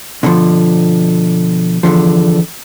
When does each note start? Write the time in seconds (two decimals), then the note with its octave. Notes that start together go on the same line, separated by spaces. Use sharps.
0.23 B2 D3 D#3 F3
1.83 E2 B2 D3 F3